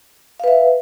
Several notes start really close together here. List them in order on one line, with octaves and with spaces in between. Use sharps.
F5 B4 E5